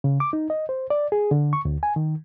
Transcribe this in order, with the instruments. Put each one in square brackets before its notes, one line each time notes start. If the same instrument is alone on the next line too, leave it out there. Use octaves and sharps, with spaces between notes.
[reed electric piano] C#3
D6
D#4
D#5
C5
D5
G#4
D3
C#6
D2
G#5
D#3